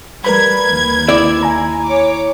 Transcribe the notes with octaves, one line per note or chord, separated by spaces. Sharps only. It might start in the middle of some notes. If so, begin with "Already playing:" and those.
G3 A#4 B4 B5 G#6
D#2
E4 D5
G#5 A#5
C#5 D6